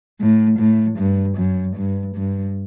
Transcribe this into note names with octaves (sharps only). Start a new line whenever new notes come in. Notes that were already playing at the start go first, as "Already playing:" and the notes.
A2
A2
G2
F#2
G2
G2